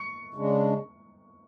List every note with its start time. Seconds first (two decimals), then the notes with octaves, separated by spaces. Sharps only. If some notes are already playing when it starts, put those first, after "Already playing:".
Already playing: C#6 C#7
0.34 C#3 G#3 D4